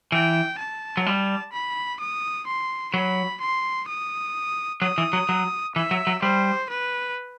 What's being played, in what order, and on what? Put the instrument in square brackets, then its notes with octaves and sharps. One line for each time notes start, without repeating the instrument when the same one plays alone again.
[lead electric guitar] E3 [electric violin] G5
[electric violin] A5
[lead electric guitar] F#3
G3
[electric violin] B5
D#6
C6
[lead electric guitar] F#3 [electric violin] B5
[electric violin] C6
D#6
[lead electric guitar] F#3 [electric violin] D#6
[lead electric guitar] E3
F#3
F#3
[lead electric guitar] E3 [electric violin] E5
[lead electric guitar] F#3
F#3
[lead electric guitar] G3 [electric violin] C5
[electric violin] B4